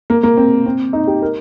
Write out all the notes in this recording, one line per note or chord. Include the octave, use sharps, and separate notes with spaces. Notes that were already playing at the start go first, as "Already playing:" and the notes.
A#3
A#3
C4
C4
D#4
G4
A#4